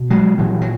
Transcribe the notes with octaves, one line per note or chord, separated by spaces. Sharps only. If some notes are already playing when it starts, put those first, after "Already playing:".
Already playing: B2
F#3 G#3
A#2 E3 F#3
F#3